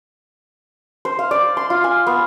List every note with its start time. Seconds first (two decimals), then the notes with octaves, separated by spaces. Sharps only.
1.05 C5
1.19 F5
1.31 D5
1.57 C6
1.70 F4
1.84 G#5
2.07 B3